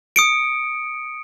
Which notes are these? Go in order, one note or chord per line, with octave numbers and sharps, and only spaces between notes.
D#6 C#7 D7